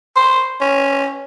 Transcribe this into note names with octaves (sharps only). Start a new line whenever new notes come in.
C5
C#4